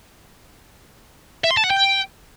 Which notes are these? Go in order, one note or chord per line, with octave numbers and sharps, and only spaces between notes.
E5
C6
A5
F#5
G5